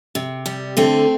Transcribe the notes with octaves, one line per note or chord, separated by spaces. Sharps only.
C3
G3
D3 A3 C4